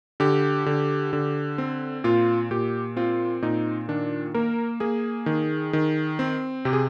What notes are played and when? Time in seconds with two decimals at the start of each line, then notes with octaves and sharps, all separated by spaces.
0.20 D3 G4
0.66 D3
1.13 D3
1.58 C4
2.04 A#2 F4
2.51 A#2 G4
2.97 C4 F4
3.42 A#2 D#4
3.88 D#3 D4
4.34 A#3 A#4
4.80 A#3 G#4
5.26 D#3
5.73 D#3
6.19 C4
6.65 C3 G4
6.73 G#4